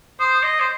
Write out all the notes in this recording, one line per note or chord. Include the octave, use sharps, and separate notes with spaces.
C5 D#6
D#5
C5